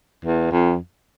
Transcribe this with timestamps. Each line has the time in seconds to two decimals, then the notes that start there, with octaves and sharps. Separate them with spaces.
0.25 E2
0.51 F2